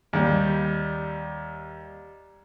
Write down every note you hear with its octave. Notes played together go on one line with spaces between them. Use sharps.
D#2 G3